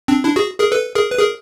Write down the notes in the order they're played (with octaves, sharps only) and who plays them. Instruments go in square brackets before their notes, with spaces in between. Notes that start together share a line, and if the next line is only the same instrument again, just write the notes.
[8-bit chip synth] C4 D4
D4 E4
F#4 G#4
G#4 A#4
A4 B4
G#4 A#4
B4
G#4 A#4